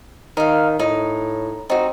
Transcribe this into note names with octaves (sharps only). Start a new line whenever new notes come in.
D#3 D#4 F5
A2 D#4
C4 D#4 F#4